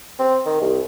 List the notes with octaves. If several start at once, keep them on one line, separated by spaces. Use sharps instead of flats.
C4
D#3
C2